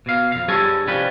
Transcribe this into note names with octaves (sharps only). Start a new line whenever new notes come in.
B2 F5
F2 F5
G2 G3 G#4 A4 C#5 G#5
C2 F3 G3 C#4 B4